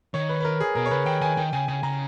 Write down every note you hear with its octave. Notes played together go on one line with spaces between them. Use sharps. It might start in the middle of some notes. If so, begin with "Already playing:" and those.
D#3 C#5
B4
B4
A#4
G#4
B2 A#4
C#5
C#3 B4
D#3 G5
D#3 G#5
D#3 G5
C#3 G#5
C#3 G#5
C#3 A#5